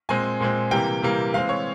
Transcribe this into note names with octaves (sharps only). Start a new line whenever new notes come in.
A#2 G#3 C4 G#5
A#2 G#3 C4
C3 E3 G3 A#3 G5
C3 E3 G3 A#3
E3 G#3 C4 F5
C#5